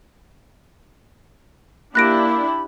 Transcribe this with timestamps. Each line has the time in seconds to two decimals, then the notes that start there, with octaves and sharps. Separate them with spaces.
1.95 A#3 D4 E4 G4 B5 F#6 A#6 D7